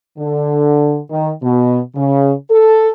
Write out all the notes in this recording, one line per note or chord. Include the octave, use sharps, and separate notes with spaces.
D3
D#3
B2
C#3
A4